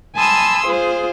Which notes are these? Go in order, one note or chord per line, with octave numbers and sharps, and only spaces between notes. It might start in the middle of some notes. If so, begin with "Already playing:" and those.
G#5 A5 B5 C6 D#6 E6
F4 G#4 C5